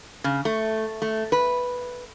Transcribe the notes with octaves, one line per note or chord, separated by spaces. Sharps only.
C#3
A3
A3
B4